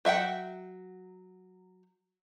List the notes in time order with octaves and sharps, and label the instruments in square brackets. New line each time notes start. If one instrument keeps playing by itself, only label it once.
[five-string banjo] F#3 E5 F#5 G5